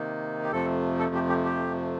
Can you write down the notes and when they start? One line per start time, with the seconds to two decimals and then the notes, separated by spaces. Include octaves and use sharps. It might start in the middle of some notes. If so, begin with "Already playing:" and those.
Already playing: C3 D#3 A#3 D#4
0.43 G4
0.52 F2 C3 F3 A3 A4
0.99 A4
1.15 G4
1.29 G4
1.45 G4